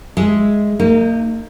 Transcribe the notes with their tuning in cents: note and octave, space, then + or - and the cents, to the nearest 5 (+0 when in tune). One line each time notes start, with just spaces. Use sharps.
G#3 +0 E5 +0
A#3 -35 D#4 +0